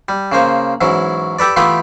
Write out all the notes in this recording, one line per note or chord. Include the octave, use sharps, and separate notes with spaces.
G3
C#3 A#3 C5
G#2 E3 F#3 C#4
G4 A4 B4 D5
E3 A3 B3 F4 G4 B4